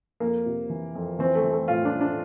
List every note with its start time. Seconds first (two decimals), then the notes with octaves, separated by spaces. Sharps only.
0.20 F2 A#3
0.46 C3
0.70 E3
0.95 F2
1.19 E3 C4
1.35 A3
1.44 E3
1.52 A3
1.68 A2 F4
1.85 D4
1.93 A2
2.01 D4